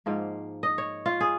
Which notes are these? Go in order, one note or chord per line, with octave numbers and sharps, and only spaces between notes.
G#2 F3 A#3
D#5
C#5
F4
G#4